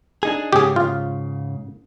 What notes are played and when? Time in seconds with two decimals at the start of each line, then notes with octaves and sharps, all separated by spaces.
0.23 D4 D#4 G#4
0.53 G#2 C#3 G4 G#4
0.76 F4